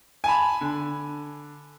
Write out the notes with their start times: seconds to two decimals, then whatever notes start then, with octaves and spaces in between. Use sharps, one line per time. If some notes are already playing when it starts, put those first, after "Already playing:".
0.24 G#5 A5 B5
0.61 D3